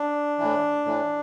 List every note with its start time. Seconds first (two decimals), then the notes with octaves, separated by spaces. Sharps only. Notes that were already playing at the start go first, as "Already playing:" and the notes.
Already playing: D4
0.38 A2 E3
0.85 A2 E3